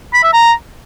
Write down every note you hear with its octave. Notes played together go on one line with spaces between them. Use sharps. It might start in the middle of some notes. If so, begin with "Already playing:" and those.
B5
E5
A#5